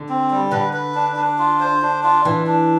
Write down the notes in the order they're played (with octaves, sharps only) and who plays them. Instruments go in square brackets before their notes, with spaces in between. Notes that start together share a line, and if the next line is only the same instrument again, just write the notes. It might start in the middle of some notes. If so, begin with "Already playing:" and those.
Already playing: [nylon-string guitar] D3
[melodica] C4
G3
[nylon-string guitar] D3 [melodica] B4
[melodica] B4
D4
D4
F4
C5
D4
F4
[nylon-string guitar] E3 [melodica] D4
[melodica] D4